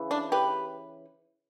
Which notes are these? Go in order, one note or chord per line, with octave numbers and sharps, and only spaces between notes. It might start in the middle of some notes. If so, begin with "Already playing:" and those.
Already playing: C#3 E3
D4
G4 B4